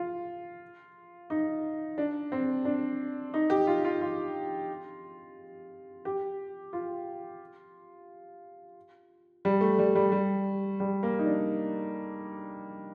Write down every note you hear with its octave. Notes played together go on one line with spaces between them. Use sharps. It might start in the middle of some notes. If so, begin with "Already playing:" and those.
Already playing: F4
D#4
D4
C4
D4
D#4
G4
F4
F4
F4
G4
F4
G3
A3
G3
G3
G3
G3
A#3
D#4
D4